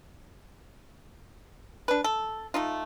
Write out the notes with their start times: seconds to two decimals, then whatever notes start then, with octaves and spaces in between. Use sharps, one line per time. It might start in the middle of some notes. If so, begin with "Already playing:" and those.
1.88 D4 B4
2.04 A4
2.54 A3 D#4 F4